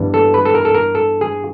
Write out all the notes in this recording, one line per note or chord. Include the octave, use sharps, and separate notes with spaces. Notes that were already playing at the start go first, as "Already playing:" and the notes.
Already playing: G2 E3 G3 B3
A4
B4
A4
A#4
A4
A#4
A4
G#4